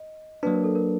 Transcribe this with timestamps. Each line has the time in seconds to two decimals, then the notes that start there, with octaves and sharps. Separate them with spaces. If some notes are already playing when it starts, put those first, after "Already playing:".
Already playing: D#5
0.43 F#3 A#3 D4 B4
0.54 A#4
0.64 A4
0.75 A#4